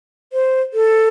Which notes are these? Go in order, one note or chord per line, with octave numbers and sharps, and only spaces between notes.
C5
A4